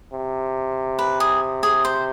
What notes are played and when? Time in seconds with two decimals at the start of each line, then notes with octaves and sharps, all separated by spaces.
0.13 C3
0.99 B4
1.20 G#4
1.63 G#4
1.85 C5